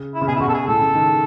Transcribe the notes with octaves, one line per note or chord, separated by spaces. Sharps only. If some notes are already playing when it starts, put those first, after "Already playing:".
Already playing: C#3
E4
C#3
B2 G#4
E4
C#3 F#4
B2 A4
G#4
A2 A4
C#3
D#3